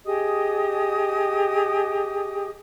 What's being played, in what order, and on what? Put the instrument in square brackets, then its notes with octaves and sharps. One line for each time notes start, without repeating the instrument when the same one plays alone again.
[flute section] G4 G#4 D#5 D#6